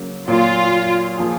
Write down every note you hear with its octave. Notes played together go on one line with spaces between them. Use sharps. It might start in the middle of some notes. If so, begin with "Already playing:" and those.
Already playing: C#3 F#3 A#3
A#2 F#3 A#3 F4
F3 A#3 F4 G#4